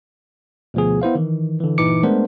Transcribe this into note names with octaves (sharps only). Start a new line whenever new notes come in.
D2 B2 F3 B3 G#4
B3 E4 C5 F5
D#3 E3
D3 E3
G1 A#2 E3 D#4 D6 C#7
G#3 A3 B3 D4 A#4 C5